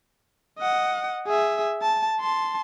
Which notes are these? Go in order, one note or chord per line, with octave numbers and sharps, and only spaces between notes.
D#5 F#5
G#4 E5
A5
A5 C6